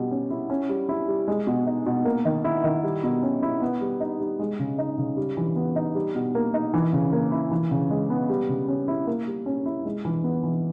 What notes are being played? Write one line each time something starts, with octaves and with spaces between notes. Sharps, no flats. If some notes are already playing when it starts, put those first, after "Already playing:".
Already playing: B2 G3
C#4
E4
C#4
G3
E4
G3
G#3
B2
D#4
B2
A#3
D#3
E4
D#3
G3
B2
C#4
E4
B3
G3
D#4
G3
G#3
C#3
D#4
C#3
G3
E3
B3
D#4
G3
B2
A#3
D#4
E3
C#3
A#3
E4
E3
C#3
G#3
B3
G3
C#3
C#4
E4
A#3
G3
C#4
E4
G#3
E3
B3
E3